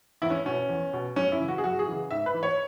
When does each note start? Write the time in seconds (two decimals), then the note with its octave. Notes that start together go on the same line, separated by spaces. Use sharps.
0.22 E2 E4
0.30 C#4
0.45 B2 C#4
0.69 E2
0.93 B2
1.16 F#2 C#4
1.32 E4
1.40 C#3 E3
1.48 F#4
1.58 G#4
1.64 F#2 F#4
1.79 G#4
1.87 C#3 E3
2.11 G#2 E5
2.26 B4
2.34 E3
2.43 C#5